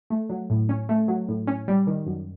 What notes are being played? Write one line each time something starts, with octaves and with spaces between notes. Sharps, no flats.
A3
F#3
A2
C#4
A3
F#3
A2
C#4
G3
D#3
F#2